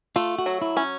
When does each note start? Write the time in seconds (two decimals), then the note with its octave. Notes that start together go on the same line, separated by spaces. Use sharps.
0.16 A3 F4
0.39 F#4
0.46 F#3
0.62 E4
0.77 C#4